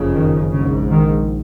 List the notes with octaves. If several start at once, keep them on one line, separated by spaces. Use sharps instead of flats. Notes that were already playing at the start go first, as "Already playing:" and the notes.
Already playing: F#1 F2 C#3
D#3
A#1 G#2 C#3
D#3